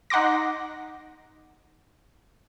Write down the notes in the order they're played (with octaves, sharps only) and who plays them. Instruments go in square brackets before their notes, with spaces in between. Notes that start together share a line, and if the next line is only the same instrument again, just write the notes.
[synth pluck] D#4 F#5 C6 D6 A#6